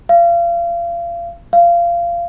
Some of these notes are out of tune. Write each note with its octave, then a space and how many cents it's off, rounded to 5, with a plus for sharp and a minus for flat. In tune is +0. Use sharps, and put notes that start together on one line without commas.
F5 -30
F5 -20